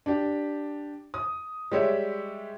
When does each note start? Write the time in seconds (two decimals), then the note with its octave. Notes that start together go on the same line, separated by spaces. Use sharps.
0.06 D4 G4
1.14 D#6
1.71 G3 G#3 G4 C#5 E5